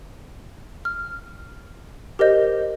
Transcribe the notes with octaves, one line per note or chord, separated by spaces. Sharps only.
F6
G4 A#4 C5 D#5 G6